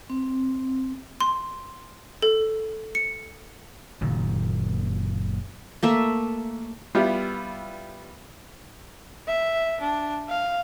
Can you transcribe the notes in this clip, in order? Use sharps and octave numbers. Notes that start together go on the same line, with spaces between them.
C4
C6
A4
C#7
F#1 A#2 D#3
A3 A#3 E5
G3 B3 E4 F4 E5
E5
D4
F5